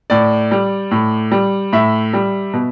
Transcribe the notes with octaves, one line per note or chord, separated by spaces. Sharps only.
A2 D5
G3
A2
G3
A2 E5
G3
B2